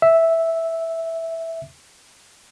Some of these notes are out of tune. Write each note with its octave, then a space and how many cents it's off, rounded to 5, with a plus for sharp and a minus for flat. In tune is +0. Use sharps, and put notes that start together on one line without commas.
E5 -5